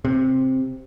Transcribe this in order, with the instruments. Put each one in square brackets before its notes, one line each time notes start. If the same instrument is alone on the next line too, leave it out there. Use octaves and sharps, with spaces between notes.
[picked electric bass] C3